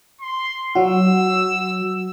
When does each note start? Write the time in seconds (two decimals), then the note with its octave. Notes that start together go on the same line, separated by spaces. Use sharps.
0.21 C6
0.75 F#3 F#4 E6